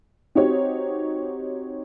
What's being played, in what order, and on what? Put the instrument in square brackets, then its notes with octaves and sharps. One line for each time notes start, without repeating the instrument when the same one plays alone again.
[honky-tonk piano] C4 D#4 F#4 G4 C#5